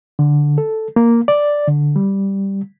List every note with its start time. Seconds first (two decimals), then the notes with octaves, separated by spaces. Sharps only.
0.19 D3
0.58 A4
0.96 A#3
1.28 D5
1.67 D3
1.96 G3